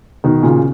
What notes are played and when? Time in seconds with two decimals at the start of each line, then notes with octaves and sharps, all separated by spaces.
0.24 B2 D#3
0.42 A#2 C#3